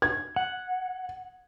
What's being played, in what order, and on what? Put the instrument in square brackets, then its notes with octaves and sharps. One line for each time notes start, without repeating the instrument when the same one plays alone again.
[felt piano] G#6
[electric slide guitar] F#5